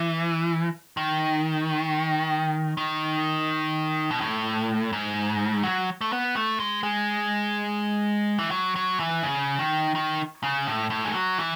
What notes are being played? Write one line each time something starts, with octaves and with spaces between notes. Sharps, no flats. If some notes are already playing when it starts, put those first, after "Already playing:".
Already playing: E3
D#3
D#3
B2
A2
G#2
F#3
A3
B3
A3
G#3
G#3
E3
F#3
F#3
E3
C#3
D#3
D#3
C#3
A2
A2
G#3
F#3
E3